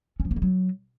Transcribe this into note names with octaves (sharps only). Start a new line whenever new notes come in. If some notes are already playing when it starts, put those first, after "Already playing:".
C#4
F3
A#3
G3
F#3